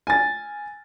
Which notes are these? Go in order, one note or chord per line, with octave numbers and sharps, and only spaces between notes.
G#5 A6